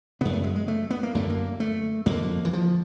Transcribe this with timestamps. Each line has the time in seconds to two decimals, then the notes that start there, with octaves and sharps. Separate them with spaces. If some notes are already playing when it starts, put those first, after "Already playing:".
0.21 F#2 C#3 B3
0.33 A3
0.44 G#3
0.55 G#3
0.68 A3
0.90 B3
1.03 A#3
1.15 F#2 D3 A3
1.30 A#3
1.60 A3
2.06 F2 D3 A#3
2.45 E3
2.53 F3